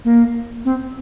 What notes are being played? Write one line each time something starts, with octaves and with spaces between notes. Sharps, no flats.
A#3
C4